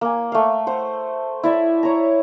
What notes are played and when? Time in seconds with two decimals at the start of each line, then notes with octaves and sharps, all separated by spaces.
0.01 A#3 G#5
0.32 A3 F5
0.67 C5 F#5
1.43 E4 D5 E5
1.83 C#5 A#5